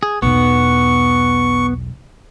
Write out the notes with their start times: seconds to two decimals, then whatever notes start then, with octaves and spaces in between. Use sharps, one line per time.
0.03 G#4
0.22 B1 E2 B3 C#6